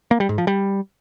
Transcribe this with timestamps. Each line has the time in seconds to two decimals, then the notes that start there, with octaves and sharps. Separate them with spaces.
0.11 A#3
0.20 G3
0.29 G#2
0.38 F3
0.47 G3